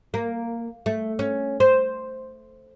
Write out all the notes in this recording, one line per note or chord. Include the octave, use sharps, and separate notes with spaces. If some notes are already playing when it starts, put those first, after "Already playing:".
A#3
A3
C#4
C5